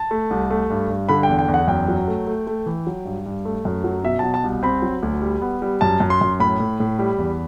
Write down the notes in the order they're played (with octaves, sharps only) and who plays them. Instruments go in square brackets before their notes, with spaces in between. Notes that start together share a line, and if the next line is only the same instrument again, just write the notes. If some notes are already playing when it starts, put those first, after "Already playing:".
Already playing: [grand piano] A5
A3
C2
A3
G2
G2
D3 B5
G5
E2
G5
E2
F#5
F#2 G5
F#3
A3
A3
A3
E3
F#3
G2
G2
A3
F#2
F#3
B2 E5
B2 A5
A5
C2
C4 B5
F#3
D2
G3
B3
G3
F#2 A5
F#2
C6
F#2
A2 B5
A2
A2
G3
E2